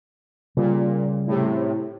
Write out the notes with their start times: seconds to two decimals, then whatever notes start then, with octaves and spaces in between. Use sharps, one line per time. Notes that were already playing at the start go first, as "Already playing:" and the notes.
0.57 A#2 C#3 G3
1.27 A2 C3